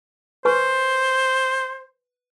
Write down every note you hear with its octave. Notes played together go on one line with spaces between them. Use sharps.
B4 C5 G#5 C#6